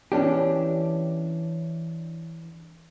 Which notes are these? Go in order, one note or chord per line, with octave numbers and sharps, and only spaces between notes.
E3 C#4 D4 G4